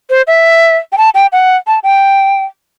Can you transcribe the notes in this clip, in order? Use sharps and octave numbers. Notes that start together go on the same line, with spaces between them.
C5
E5
G5
A5
G5
F#5
A5
G5